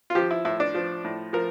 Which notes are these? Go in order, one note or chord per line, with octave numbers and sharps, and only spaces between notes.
F4
F3 G4
E4
A2 E4
D4
F3
A2
F3 A#4